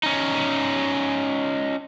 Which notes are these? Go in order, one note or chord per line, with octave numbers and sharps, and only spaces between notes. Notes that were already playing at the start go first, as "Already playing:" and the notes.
C#4 D#4